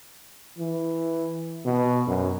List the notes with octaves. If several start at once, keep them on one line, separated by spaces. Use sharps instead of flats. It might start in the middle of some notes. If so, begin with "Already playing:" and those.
E3
B2
F#2